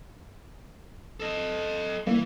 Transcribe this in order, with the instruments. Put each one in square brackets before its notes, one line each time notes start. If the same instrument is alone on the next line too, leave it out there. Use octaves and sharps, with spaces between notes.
[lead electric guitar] A4 D#5
[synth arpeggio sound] D#3 G3 A#3 [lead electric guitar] E3